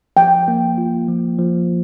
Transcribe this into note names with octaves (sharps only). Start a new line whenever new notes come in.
F3 G5
A#3
F4
F3
F3